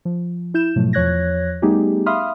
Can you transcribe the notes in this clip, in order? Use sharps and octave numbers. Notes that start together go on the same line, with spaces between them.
F3
E4 G6 E7
G#2 B2 F3 F#3 A3
E2 F3 C#5 F#6 G#6 A#6
G3 A3 B3 D#4 G4 G#4
E5 F5 B5 C6 D#6 F6